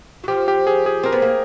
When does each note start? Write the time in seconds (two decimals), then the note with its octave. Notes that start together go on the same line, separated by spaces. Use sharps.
0.24 F#3
0.28 F3 G4
0.48 G4
0.67 G#4
0.86 G#4
1.03 C4 A#4
1.12 B3
1.22 A#3